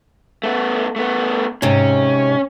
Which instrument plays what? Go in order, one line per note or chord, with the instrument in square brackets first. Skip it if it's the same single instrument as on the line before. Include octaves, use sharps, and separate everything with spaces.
[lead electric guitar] A3 B3
A3 B3
[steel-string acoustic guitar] G#2 C3 [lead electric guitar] C#4